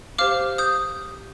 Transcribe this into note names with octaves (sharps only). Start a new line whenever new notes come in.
G4 C5 F5 D6 F6
D#6 G6